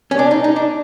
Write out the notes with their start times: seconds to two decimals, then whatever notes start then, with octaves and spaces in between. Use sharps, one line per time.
0.11 C#4
0.19 D4
0.31 D#4
0.44 D#4
0.56 D4